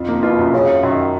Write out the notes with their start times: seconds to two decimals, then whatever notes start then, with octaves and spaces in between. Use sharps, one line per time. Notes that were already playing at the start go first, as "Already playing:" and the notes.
Already playing: F2 F4
0.09 A#3
0.23 B2 F4
0.38 F#2
0.53 F#2 C#3
0.68 F#2
0.83 F#2 D#3